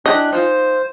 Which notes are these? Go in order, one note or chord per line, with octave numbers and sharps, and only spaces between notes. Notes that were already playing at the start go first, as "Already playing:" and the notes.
D4 E4 G4 D#5 G#5 F#6
D#4 F4 C5 G#5